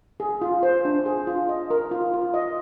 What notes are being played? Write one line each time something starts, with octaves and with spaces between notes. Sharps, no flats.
G#4
F4
C5
D4
G#4
F4
D#5
A#4
F4
F4
D#5